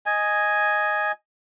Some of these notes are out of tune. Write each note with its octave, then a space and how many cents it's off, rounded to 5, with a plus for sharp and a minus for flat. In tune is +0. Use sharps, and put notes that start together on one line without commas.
D#5 +0 G#5 +0